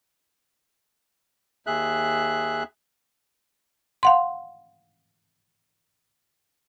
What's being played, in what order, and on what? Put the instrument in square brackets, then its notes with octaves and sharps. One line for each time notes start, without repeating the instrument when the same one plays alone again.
[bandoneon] D#2 G#4 E5 F#6
[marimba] F5 F#5 C6